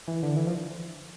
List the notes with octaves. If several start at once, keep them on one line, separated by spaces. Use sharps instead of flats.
E3
D3
E3
F3